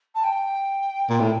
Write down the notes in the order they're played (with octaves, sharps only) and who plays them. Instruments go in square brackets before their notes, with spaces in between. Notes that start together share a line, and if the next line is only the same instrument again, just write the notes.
[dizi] A5
G5
[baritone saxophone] A#2
A2